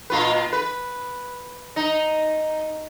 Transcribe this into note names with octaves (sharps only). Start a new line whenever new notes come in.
A#2 F4 B4
B4
D#4